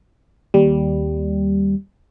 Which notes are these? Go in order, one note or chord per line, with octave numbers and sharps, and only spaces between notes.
D#2 G3